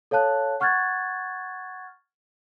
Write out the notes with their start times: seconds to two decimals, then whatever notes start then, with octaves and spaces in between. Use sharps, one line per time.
0.11 A4 C#5 F5 A5 F#6
0.60 F#5 C#6 F6 F#6 G#6 A6